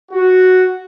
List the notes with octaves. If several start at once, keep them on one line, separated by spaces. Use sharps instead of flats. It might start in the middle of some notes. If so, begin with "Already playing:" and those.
F#4